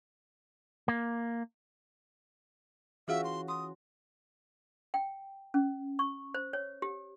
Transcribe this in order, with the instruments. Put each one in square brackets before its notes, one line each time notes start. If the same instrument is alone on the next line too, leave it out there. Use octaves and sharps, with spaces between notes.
[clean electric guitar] A#3
[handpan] E3 C#4 F#4 [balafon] F4 G#4 F5 [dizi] E5
[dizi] C6
[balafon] C6 [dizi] D#6
[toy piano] G5
C#4
C#6
C5
C#5
G4